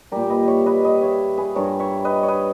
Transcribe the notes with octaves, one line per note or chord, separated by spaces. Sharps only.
A#2 G3 G4 A#4
B4 D#5
C#5 E5
B4 D#5
B4 D#5
C#5 E5
G#4 B4
G2 G3 A#4 C#5
C#5 E5
B4 D#5
C#5
B4 D#5